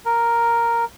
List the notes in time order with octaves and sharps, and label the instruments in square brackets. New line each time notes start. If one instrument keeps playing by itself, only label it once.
[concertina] A#4